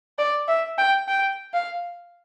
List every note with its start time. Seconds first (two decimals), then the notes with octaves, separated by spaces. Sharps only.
0.18 D5
0.48 E5
0.78 G5
1.08 G5
1.53 F5